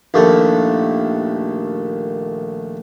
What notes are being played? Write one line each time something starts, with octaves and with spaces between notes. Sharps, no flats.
A#1 D#2 A3